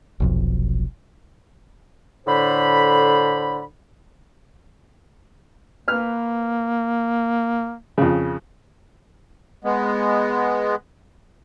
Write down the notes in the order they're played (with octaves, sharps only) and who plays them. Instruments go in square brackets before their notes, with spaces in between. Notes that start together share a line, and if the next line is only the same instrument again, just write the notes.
[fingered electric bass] F1 B1 F2
[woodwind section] A2 D3 C5 B5
[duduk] A#3 [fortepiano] B4 F6
[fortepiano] F2 C#3
[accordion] G#3 B3